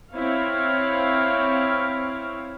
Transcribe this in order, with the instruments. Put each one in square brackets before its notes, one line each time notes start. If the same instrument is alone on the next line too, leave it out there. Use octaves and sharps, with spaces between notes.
[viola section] C4 E4 C#5 F5